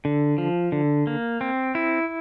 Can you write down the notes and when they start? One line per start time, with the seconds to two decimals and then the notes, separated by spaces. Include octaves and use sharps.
0.05 D3
0.38 F3
0.72 D3
1.07 A#3
1.41 C4
1.75 E4